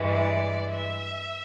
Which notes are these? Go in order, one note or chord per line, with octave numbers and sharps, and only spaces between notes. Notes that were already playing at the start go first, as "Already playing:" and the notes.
Already playing: G2 E3 G#3
D5
E5